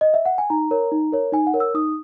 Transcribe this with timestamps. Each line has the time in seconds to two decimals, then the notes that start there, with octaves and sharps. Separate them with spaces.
0.01 D#5
0.14 E5
0.25 F#5
0.38 G#5
0.50 D#4 A#5
0.71 A#4 C#5
0.92 D#4
1.12 A#4 C#5
1.32 D#4 G#5
1.47 F#5
1.54 A#4 C#5
1.60 E6
1.74 D#4 D#6